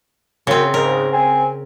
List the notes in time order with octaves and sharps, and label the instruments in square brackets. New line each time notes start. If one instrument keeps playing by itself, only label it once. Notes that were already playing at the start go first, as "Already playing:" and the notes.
[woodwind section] F#2 [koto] C#3 C4
[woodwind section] G#2 C#3 [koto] A#4
[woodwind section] C4 G#5